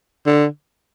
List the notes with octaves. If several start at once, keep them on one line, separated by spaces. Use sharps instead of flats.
D3